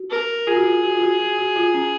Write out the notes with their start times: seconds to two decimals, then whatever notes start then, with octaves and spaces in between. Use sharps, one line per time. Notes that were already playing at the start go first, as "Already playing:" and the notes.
Already playing: F#4
0.11 A#4
0.47 F4 G#4
0.56 F#4
0.65 F4
0.83 F#4
0.95 F4
1.02 F#4
1.20 F#4
1.38 F#4
1.56 F4
1.74 C#4